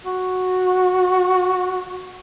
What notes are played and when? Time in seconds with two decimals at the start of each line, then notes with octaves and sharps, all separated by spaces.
0.05 F#4